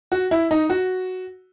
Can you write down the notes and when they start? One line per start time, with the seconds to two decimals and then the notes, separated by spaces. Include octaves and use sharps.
0.12 F#4
0.31 E4
0.51 D#4
0.70 F#4